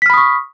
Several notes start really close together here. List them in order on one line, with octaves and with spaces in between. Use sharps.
B6 F6 B5 D#6 C#6